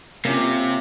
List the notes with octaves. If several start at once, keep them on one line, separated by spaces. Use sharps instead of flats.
C3 A#3 C#4 F4